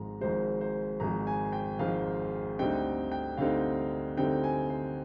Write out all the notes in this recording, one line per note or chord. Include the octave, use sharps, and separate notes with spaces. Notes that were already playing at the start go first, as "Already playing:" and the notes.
Already playing: G#1 G#2 F3 G#3 A#5
G#1 G#2 F3 G#3 C5
C5
G#1 G#2 F3 G#3 A#5
G#5
G5
G#1 G#2 F3 G#3 F5
D2 D3 G3 C4 D#4 G5
G5
D2 D3 G3 C4 D#4 F5
D2 D3 G3 C4 D#4 G5
G#5
C5